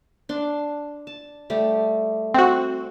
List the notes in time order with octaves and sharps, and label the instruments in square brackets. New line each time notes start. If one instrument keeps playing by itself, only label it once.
[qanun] D4 C6
A5
G3 A3 G4
[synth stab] C4 F#4